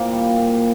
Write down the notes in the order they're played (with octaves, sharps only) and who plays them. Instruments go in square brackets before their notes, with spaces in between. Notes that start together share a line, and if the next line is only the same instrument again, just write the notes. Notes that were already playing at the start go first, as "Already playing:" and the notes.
Already playing: [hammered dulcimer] A#2 A#3 C4
G3
A#2